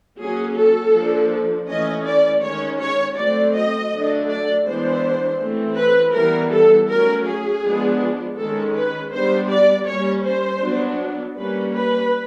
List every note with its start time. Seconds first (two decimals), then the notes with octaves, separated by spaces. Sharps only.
0.19 F#3 A#3 C#4 G#4
0.57 A4
0.94 F3 A#3 D4
1.68 E3 A3 C#4 D#5
2.05 D5
2.42 D#3 G#3 C#4 C#5
2.80 C#5
3.17 F#3 A3 C4 D5
3.54 D#5
3.92 D3 F#3 A3 D4
4.29 D5
4.66 E3 G#3 B3 D4 C5
5.40 E3 A3 C4
5.77 B4
6.15 E3 G3 B3 A#4
6.52 A4
6.89 F#3 A3 C#4 A#4
7.26 G#4
7.63 F3 G#3 B3 D4
8.38 D#3 G#3 C#4 A4
8.75 B4
9.12 G3 B3 D4 C5
9.50 D5
9.86 G3 A#3 C#4 C#5
10.24 C5
10.61 F#3 B3 D4
11.36 G3 A#3 C#4 B4
11.73 B4